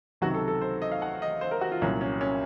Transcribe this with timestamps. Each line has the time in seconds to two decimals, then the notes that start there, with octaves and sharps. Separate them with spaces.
0.21 C#2 C3 D#3 F#3 F#4
0.34 A4
0.48 A4
0.61 C5
0.82 D#5
0.92 F5
1.02 F#5
1.22 D#5
1.41 C5
1.51 A#4
1.61 F#4
1.72 F4
1.82 C2 A#2 F#3 C#4
2.01 C#4
2.21 C#4